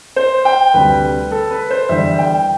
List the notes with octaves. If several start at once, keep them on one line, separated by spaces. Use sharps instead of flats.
C5
G5
D2 C3 G3 B4
A4
B4
C5
E2 D3 G3 E5
G5